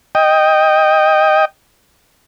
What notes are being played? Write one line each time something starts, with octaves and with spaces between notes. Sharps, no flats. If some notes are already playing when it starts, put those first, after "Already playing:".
D#5 G5